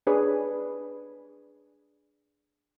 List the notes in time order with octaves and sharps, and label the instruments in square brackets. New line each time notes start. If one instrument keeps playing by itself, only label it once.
[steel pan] D4 G#4 B4 C#5